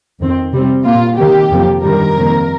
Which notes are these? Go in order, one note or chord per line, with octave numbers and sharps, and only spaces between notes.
F2 D#3 C4
C3 G3 C4
A#2 A#3 F4
C3 D#3 A#3 G4
F2 C3 F3 A#3
G2 D#3 G3 A#4
F2 C3 D#3 A#3